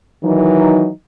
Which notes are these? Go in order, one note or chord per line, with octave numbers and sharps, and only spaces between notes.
D#3 E3 F#3 D#4